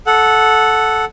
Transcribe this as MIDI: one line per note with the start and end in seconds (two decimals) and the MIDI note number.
0.07 1.05 69
0.07 1.05 78